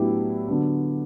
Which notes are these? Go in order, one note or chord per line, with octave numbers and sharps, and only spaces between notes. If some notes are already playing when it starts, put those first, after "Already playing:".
Already playing: A2 F#3 B3 D4 E4 G4
D3 F#3 B3 D4